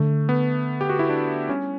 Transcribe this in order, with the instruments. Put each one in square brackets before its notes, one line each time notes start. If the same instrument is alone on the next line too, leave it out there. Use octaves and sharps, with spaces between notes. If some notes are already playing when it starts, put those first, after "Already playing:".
Already playing: [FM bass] D3 [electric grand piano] A3
[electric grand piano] B3
G4
F#4
E4
D4
[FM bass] G3 [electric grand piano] C#4